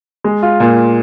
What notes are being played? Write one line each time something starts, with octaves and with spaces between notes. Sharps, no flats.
G#3
F4
A#2